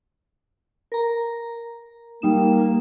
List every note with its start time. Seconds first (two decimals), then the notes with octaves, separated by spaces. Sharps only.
0.92 A#4 A#5
2.22 G3 A#3 D#4 E7